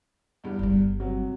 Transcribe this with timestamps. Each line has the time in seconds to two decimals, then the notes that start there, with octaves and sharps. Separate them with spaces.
0.44 E2 G2
0.59 G1 G3
1.00 C3 F#3